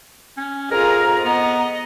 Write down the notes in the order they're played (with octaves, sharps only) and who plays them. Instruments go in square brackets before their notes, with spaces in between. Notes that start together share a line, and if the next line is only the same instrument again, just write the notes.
[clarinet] C#4
[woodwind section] F2 G#2 A#5 [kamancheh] F4 G#4 [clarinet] A#4
[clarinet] B3 [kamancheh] D#5